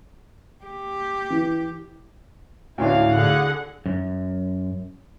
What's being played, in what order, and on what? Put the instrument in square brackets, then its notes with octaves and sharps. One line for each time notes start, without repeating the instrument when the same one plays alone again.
[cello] G4
[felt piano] E3
[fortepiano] D2 C#4 D4 [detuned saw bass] A2 [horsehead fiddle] E4 F5
[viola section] D3 G#4 F#5
[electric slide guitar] F#2